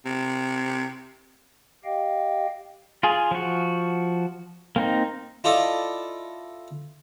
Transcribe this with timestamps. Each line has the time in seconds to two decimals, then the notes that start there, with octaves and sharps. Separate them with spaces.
0.05 C3
1.85 G4 D#5 F5 G5
3.03 F4 G#4
3.31 F3 F#4
4.76 A#3 C4 D#4
5.44 E4 F4 A4 D5 D#5